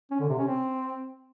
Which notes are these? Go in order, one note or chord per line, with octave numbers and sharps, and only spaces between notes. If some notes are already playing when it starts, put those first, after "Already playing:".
C#4
D3
C3
C#4
C4